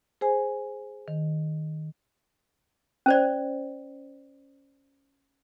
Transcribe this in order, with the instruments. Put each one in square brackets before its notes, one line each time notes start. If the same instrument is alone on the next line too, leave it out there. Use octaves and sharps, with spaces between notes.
[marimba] G#4 C5 G#5
D#3
[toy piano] C#4 C5 D5